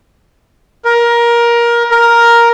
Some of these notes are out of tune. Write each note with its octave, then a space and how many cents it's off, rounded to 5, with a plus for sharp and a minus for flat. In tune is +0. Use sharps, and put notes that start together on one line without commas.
A#4 +20
A#4 +5